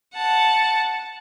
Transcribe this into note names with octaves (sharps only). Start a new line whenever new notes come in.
F#5 A5